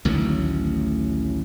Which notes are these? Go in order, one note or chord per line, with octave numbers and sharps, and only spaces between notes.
A1 D2 D#3 F#3